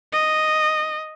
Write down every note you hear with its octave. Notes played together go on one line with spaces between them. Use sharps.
D#5